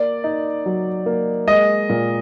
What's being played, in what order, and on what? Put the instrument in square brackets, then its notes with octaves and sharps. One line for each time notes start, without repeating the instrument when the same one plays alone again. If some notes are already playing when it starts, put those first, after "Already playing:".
Already playing: [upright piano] A#3 [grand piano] D5
[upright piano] D#4
F#3
A#3
[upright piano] G#3 [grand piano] D#5
[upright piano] A#2